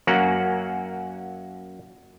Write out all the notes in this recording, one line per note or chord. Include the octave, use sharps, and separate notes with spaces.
F#2 A#3 C#4 F#5